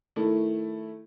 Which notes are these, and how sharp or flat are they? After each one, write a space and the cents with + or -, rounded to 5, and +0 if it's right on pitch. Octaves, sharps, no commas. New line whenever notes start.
D#3 +0 A3 +0 E4 +0